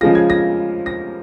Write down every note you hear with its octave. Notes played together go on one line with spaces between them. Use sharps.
C#3 F3 G#3 F4 A#6
G#6
A#6
A#6